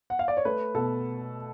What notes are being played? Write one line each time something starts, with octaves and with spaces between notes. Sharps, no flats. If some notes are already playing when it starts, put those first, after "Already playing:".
F#5
F5
D5
C#5
A3 B4
B2 A4